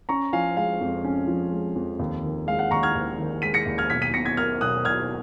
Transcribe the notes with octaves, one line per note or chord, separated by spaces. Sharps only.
C#4 A#5 C#6
F3 F5 G#5
G#3 F5
F2
C#4
F3
G#3
F2
D#2
D#3
G#3 F5
F#5
D#2 A#5 C#6
F6 G#6
D#2
D#3
G#3 B6 D#7
A#6 C#7
D#2
F6 G#6
B1 G#6 B6
B6 D#7
B2 A#6 C#7
G#6 B6
A#3 F6 G#6
B1 D#6 F#6
B1 F6 G#6